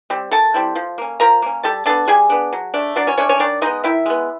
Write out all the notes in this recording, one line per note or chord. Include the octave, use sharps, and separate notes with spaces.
G3 C4
D#3 A4 A5
G3 C4 E4
F3
A#3 C#4
F3 A#4 A#5
A#3 C#4
G3 A4 A5
B3 D4 A4 A5
G3 G#4 G#5
B3 D4
F#3
A3 D4
F#3 D4 D5
C#4 C#5
A3 C#4 D4 C#5
C#4 C#5
D#3 D4 D5
G#3 B3 D#4 D#5
D#3 E4 E5
G#3 B3